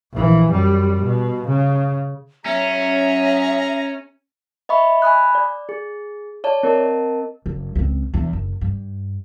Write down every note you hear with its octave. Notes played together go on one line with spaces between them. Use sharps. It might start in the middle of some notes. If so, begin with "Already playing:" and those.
A#1 E3
F#2 G3
B2
C#3
F#3 C#4 G#4 E5 A#5
D#5 E5 B5 C#6
G#5 B5 D#6 F#6
D5
G#4
C#5 D5 A5
C4 A#4 D#5 A5
F#1
C#2 C4
E2 D4
F#1
G2